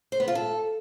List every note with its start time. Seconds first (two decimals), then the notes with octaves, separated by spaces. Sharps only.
0.12 C5
0.20 B3
0.28 F4
0.35 A4